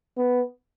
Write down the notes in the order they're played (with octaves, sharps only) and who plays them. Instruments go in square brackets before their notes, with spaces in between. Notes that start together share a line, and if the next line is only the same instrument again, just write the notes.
[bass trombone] B3